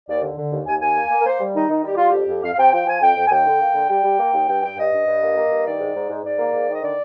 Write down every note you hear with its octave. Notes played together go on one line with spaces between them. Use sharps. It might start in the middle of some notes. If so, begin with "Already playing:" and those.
D#2 D5
D3
D3
D#2
D#2 G#5
D#2 G#5
A#3
A#3
A#4
A#3 C5
G3
D#3 D#4
D#3 D#4
G3 G4
G3 F4
F2 G4
F2
F2 F5
F5
C3 G5
F3 G5
F3 G#5
F2 G5
F2
G#5
D#2 G5
D3
A#3
D3
G3 G5
G3
A#3
D#2
G2 G5
G2 G5
G2 D#5
G2
G2
A#3
A#3
G2
D#3 D5
G#2
G#2
G#2
G#2 D5
A#3
G#2
D#3
D#5
D3 D5